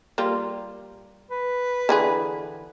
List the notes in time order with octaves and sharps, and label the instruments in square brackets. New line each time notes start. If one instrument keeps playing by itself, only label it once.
[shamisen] G3 A#3 F4
[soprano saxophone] B4
[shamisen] D3 E3 G#4